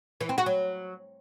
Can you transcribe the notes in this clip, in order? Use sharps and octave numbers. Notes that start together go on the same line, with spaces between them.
E3
C4
F#4
F#3